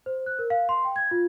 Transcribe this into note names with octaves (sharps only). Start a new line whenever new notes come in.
C5
F#6
A#4
F5
C6
G5
G#6
F4